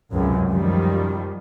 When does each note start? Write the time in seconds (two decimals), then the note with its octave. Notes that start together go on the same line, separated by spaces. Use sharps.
0.11 C#2 F#2 C3
0.49 F#2 D#3 F3 G3